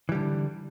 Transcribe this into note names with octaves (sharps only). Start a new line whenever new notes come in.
D3 E3 G3